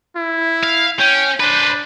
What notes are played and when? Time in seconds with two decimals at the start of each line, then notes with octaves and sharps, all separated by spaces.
0.16 E4
0.63 F5
0.99 C#4 G5
1.40 D4 B4 C5